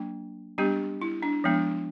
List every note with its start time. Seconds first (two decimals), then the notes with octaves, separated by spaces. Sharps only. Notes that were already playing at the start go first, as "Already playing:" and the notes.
Already playing: F#3 A#3 D4
0.58 G3 B3 D4 G4
1.02 E4
1.23 D4
1.44 F3 G#3 B3 D4